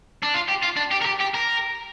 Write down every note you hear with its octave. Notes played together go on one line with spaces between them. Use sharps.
D4
F4
G4
F4
D4
G4
A#4
G4
G4
A#4